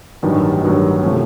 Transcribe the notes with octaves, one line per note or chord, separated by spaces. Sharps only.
A1 G2 D#3 F#3
A1 G2 D#3 F#3
C3 F3 A3 C#4